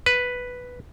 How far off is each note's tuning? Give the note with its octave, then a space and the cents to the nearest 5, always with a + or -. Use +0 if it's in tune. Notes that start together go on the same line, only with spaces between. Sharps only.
B4 +0